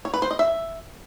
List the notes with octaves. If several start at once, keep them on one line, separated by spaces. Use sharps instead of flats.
C#5
B4
C5
D#5
E5